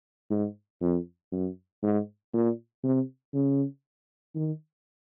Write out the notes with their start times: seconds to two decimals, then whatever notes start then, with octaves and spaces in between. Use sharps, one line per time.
0.30 G#2
0.81 F2
1.32 F#2
1.83 G#2
2.33 A#2
2.84 C3
3.34 C#3
4.36 D#3